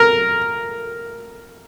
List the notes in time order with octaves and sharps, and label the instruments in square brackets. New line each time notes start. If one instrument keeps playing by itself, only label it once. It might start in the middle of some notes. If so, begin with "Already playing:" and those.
Already playing: [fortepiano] A#4